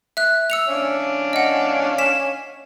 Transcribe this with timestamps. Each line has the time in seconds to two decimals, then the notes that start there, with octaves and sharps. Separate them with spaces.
0.17 E5 F#6
0.50 E6 C#7 F7
0.68 C#4 D4 F5
1.33 D#5 F#5
1.98 B6 E7